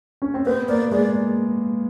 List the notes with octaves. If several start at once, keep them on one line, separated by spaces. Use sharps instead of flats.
C#4
C4
B3 C5
A#3 D5
G#3 D5